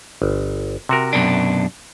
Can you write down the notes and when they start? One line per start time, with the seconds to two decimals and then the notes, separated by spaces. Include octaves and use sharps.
0.22 G1
0.89 C3 F#4 A#4
1.13 F#2 B2 D4